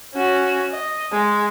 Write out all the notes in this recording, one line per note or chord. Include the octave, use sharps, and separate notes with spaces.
C#4 F#4
D#5
G#3